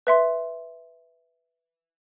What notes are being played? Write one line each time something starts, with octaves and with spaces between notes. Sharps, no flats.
B4 E5 C6